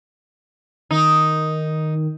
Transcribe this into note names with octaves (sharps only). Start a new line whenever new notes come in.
D#3 D#4